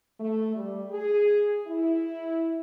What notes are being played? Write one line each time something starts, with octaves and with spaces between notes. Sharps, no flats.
A3
G3
G#4
E4